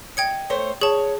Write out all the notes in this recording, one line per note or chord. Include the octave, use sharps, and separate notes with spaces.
D#5 G5 G#6 C#7
A3 C5 C#5
G#4 C#5 A5